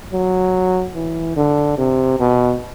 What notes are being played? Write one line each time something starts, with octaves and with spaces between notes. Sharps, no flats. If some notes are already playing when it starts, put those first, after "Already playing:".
F#3
E3
D3
C3
B2